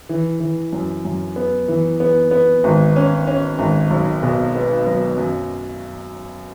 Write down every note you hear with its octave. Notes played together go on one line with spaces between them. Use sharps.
E3
E3
F#2
F#2
B3
E3
B3
B3
G#1
C#4
C#4
G#1
B1
B2
B3
F#3
F#2